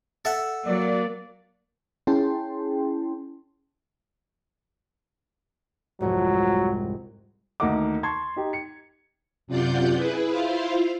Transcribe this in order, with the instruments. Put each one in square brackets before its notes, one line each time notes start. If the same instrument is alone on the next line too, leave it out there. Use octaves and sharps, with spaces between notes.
[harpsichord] A4 E5 F#5
[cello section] F#3 [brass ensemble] A#3 D5
[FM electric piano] C#4 E4 G#4 G5 A5 C6
[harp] C2 F2 G#2 [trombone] F#3
[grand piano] D2 D#3 A#3 D#5 F#5 D6
A5 C6 C#6 G#6
D#4 G4
C#7
[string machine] F#2 C3 F4 D5 F#5 G6
E4 G#4 B4
E4 F4 C5 F5